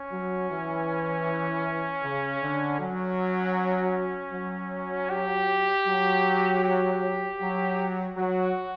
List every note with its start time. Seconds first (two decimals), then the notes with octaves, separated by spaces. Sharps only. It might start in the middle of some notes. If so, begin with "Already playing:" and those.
Already playing: C#4
0.11 F#3
0.50 E3
2.03 C#3
2.42 D3
2.80 F#3 C#4
4.33 F#3
5.10 G4
5.87 F#3
6.64 G4
7.40 F#3
8.17 F#3 F#4